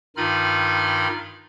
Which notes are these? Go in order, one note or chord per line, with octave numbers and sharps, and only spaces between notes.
G2 D#3 D#4 F4 B5 F6